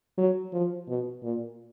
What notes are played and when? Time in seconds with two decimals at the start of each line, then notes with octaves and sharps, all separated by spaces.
0.18 F#3
0.53 F3
0.88 B2
1.23 A#2